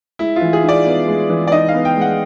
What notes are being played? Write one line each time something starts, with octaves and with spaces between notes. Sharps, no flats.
G#3 E4
F4
E3
G#4
D#4
D5
B3
G#3
E3
D5
D#4 D#5
F5
B3
G5
G#3
F#5